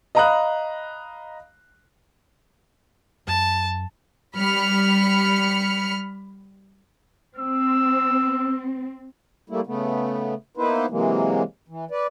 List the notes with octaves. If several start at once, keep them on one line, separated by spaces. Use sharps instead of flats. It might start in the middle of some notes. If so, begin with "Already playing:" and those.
D#5 F5 A#5 B5 D#6 F#6
F#2 A5
G3 B5 F6 C#7
C4 E6
G3 A3 A#3 E4
C#3 A3 B3
A#3 B3 D#4 E4 B4 C5
C3 E3 F#3 G#3 A#3
E3
B4 D5